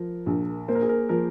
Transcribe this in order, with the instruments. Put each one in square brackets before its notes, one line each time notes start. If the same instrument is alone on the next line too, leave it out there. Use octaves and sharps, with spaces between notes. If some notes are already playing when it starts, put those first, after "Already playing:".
Already playing: [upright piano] F3 [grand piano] A#4
[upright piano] A#1
[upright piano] A#3 [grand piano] C5
[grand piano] A#4
G#4
A#4
[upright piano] F3 [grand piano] A#4